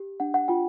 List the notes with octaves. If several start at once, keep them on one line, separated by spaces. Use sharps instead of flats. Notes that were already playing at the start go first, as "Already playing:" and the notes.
Already playing: G4
D4 F#5
F#5
F4 G5